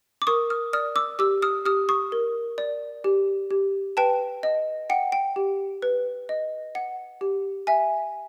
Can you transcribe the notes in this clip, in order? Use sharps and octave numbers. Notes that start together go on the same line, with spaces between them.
D6
A#4 C#6 D#6
D#6 F6
D5 D#6 F6
D6 E6
G4 D6 E6
D#6 F6
G4 D#6 F6
C#6 D#6
A#4
D5
G4
G4
B4 G5 A5
D#5
F#5 G5
G5
G4
B4
D#5
F#5
G4
E5 G#5